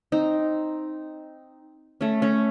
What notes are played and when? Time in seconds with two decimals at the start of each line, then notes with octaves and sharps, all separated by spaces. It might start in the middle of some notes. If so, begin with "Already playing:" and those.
0.12 C4 D#4
2.01 A3 C#4
2.22 A3 C#4